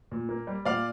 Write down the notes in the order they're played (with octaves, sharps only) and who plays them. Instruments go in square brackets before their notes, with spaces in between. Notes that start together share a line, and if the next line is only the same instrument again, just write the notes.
[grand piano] A#2
A#3
G3
A#2 D5 F5